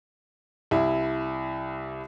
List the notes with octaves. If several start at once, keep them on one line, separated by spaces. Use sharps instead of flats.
C2 E4